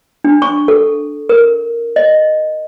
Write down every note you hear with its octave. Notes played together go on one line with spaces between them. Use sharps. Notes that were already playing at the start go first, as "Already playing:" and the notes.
D4
C#6
A4
A#4
D#5